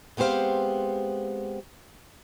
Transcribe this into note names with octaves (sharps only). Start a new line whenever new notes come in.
G#3 B3 C4 G4 C5 F5